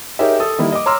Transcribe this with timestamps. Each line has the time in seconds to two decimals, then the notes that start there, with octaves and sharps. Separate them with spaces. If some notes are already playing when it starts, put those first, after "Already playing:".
0.19 D#4 G4 G#4 A#4 C#5 E5
0.40 A4 D#6
0.58 D#3 G3 A#3 E4 A#4
0.72 D#5 D6
0.86 C#5 A#5 C6 E6 F6